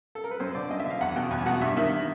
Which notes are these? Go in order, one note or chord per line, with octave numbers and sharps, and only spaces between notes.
A4
A#4
B4
F#2 C5
D3 D5
F#2 D#5
E5
D3 F5
E2 F#5
B2 G5
E2 G#5
B2 F#5
G2 E5
D#3 E5